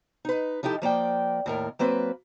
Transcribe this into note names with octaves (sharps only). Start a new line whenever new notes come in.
D#4 B4
F3 D#4 E4 G4 A4
F3 A#3 D5 G5
D#2 A2 A#4
F#3 A#3 C4 B4